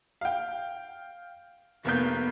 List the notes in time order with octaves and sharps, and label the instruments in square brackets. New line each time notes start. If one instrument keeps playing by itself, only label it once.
[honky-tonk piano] F5 G5
[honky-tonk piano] F1 A#3 G6 [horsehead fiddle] B3